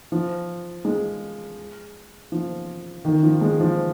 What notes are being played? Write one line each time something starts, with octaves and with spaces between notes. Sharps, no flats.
F3
G#3
F3
D#3
F3
G#3
F3